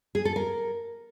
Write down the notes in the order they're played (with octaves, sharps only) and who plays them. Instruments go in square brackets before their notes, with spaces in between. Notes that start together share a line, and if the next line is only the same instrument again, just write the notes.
[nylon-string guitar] G#4
A4
A#4